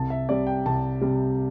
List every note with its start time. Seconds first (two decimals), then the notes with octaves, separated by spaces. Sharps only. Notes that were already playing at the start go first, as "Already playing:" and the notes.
Already playing: C2 A5
0.10 E5
0.28 C3 G3 D5
0.47 G5
0.66 C2 A5
1.01 C3 G3